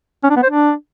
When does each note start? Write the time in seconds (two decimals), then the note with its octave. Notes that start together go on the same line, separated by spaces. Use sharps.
0.24 C#4
0.30 D4
0.37 B3
0.43 C5
0.50 D4